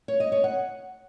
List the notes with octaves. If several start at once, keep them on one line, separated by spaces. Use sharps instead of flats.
C#5
D#5
C#5
F#5